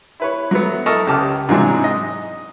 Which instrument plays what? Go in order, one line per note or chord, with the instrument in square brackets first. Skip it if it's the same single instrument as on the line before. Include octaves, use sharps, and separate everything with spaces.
[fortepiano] E4 B4 C#5
F#3 A3 B3
E4 A4 A#4 D#5 A5 C#6
C#2 G4 A5 D6 D#6 F6
G#2 C3 E3 F#3 G#3 D4
D#5